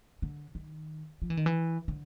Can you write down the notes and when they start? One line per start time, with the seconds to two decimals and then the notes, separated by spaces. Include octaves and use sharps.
0.22 D3
0.55 D#3
1.22 F3
1.30 E3
1.37 D#3
1.46 E3
1.88 D3